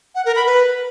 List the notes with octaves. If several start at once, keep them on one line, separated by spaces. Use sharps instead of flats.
F#5
A#4
B5
B4